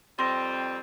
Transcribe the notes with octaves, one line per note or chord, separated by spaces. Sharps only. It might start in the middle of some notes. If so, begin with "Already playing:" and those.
F2 G3 C4 C6 A#6